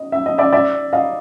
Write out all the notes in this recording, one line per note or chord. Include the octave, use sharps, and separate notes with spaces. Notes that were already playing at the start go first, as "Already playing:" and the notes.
Already playing: D#5
E5
D#5
D5 E5
D5 E5
D#5 F5